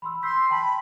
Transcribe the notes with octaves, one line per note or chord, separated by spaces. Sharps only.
B5 C6 E6
C6 E6 G6 B6
G5 A5 B5 C6